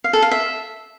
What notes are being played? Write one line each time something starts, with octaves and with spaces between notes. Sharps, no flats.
F5
A4
F5
E5